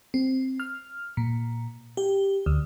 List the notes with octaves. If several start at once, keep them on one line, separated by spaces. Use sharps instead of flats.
C4
F6
A#2
G4
D2